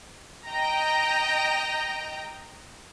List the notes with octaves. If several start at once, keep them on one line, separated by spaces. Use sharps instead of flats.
D#5 G5 A#5